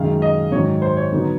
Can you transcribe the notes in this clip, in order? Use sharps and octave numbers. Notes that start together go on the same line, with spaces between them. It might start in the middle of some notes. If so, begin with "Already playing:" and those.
Already playing: F#2 D#3 G#3 F5
D#5
G#2 D#3 F#3 C#5
C5
C#5
D3 F#3 B3 D#4